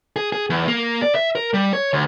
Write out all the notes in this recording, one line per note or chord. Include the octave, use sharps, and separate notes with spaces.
G#4
G#4
E2
A#3
D5
E5
A#4
G3
C#5
D2